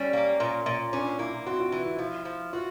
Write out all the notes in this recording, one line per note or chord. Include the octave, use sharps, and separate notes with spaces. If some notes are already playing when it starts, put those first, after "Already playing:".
Already playing: G3 C#4
A#3
A#2
A#2
C#4 D4
A#3 E4
C4 F#4
F4
E3 E4
E4
F3 E4
F3
F4 F#4